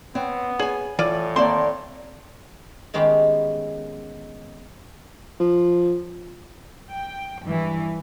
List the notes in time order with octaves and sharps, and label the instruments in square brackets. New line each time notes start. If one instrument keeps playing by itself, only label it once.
[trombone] B3 [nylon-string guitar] C4 C#5
[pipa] G#4 [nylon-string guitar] C#5 G#5
[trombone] A2 [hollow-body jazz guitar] E3 [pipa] F4 D5
[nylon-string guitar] D#3 A#3 D5 [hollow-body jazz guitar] C4 A5 [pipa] C6
[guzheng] D#3 G#3 B3 C#4 G4
[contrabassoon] F3
[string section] G5
G2 E3